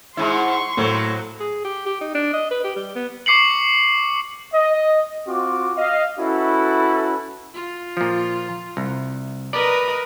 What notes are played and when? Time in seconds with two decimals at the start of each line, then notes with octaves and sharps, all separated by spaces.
0.17 G#2 E4 C6 C#6
0.77 A2 F#3 A#3 C4
1.40 G#4
1.64 G4
1.86 G4
2.01 D#4
2.15 D4
2.33 D#5
2.51 B4
2.64 G4
2.76 G3
2.95 B3
3.26 C#6 D6 C7 C#7 F#7
4.53 D#5
5.27 C4 F4 F#4 D6
5.76 D#5 F5
6.19 C#4 E4 F#4 A4 B4
7.54 F4
7.97 A#2 F3
8.77 C2
9.53 A#4 B4 D5 D#5